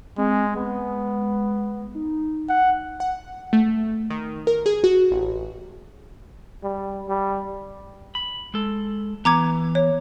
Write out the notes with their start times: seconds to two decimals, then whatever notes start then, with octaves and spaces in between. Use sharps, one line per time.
0.18 G#3 C4
0.56 G#3 B3
1.95 D#4
2.49 F#5
3.00 F#5
3.53 A3
4.10 D#3
4.47 A#4
4.66 G#4
4.84 F#4
5.11 A1
6.63 G3
7.09 G3
8.15 B5
8.54 G#3 A4
9.25 E3 B3 A#5 D6 G#6
9.75 C#5